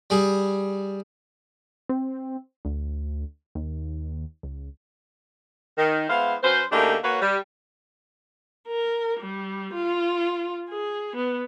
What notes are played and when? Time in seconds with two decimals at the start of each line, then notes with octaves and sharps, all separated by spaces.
0.10 G3 G#4
1.89 C4
2.65 D2
3.55 D#2
4.43 C#2
5.78 D#3
6.09 G#3 B3 E4 C5 F5
6.43 F#3 C#4 B4 C5
6.72 C#3 A3 A#3 D4 D#4 G4
7.04 A#3 F#4 B4 C#5
7.21 G3
8.67 A#4
9.20 G3
9.74 F4
10.69 G#4
11.16 B3